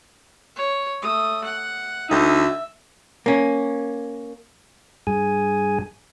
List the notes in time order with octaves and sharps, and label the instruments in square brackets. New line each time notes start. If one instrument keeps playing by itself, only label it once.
[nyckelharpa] C#5
A3 D#6
F#5
[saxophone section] D2 D#4 [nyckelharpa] E5
[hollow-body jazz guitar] A#3 C#4
[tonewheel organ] G2 G#4 G#5